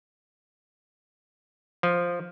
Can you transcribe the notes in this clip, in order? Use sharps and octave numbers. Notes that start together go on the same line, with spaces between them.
F3